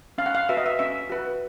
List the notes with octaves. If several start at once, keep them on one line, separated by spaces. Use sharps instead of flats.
C#4 F5
F#5
F5
F#4 B4 E5
D#5
E5
C#4 E5
F#4 B4